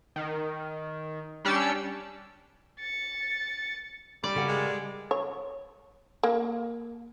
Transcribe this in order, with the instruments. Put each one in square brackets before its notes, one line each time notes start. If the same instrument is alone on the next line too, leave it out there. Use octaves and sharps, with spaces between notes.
[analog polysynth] D#3
G3 C#4 D4 G4 E6 C#7
[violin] A6 C#7
[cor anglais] G3 [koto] D5
[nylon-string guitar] C#3 A#4 F#5
[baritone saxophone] G#3
[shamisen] C#5
A#3